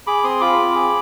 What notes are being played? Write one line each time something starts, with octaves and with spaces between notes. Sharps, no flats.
G#4 B5 D6
C4 C6 D#6
F4 B5 D6
C4
G#4